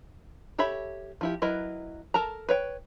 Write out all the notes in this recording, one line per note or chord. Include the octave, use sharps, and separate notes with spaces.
G4 A4 C#5 E5 B5
F3 E4 G4
F#3 E4 A#4 B4 D#5
A4 A#4 A5 A#5
B4 C#5 G5